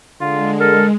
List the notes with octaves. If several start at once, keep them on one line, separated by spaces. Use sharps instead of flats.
D3 G#3 F4
A4 A#4